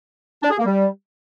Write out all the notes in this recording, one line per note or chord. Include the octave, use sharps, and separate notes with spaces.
D4
G#4
A#3
G3